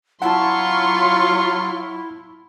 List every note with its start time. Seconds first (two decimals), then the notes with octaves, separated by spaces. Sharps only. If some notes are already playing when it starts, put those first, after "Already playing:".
0.22 F#3 E4 F4 F#5 A5 C6 C#6